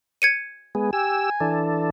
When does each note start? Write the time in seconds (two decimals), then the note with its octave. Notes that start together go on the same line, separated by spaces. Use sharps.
0.22 G#6 C#7 D#7
0.75 G#3 B3 G#4
0.93 G4 G#5 E6
1.40 E3 D4 A4